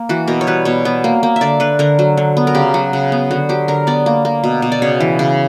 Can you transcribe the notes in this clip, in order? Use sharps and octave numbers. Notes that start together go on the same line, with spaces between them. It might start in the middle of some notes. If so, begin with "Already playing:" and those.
Already playing: A#3
E3 F#4
B2 A#4
C#5
G3 B4
B2 C#5
B3
A#3
A#3
E5
D3 D5
D3 B4
D3 A#4
F#3
D3
B3
A#4
C#3 G4
F#3 F#4
C#3
B3
D3 F#4
F#3 G4
D3 A#4
B3 D5
A#3
A#3
B2
B2
D5
C#3 C#5
E3
C#3